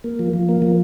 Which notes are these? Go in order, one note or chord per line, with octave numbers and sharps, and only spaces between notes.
A#3
F3
F3
A#3
F3